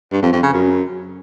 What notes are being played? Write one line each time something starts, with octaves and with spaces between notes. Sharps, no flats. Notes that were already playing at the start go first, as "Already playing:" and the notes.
G2
F2
F2
C#3
F#2